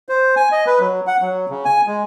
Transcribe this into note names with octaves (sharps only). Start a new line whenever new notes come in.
C5
G#5
D#5
B4
F#3
F#5
F#3
C#3
G#5
G#3